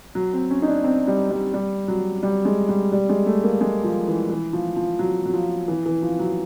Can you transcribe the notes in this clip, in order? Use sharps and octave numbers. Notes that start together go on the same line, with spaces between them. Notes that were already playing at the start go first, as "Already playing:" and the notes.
F#3
C4
C#4
D#4
D4
C4
G3
G3
G3
F#3
G3
G#3
G3
G3
G#3
A3
A#3
G#3
F3
E3
E3
F3
F3
F#3
F#3
F3
E3
E3
F3
F#3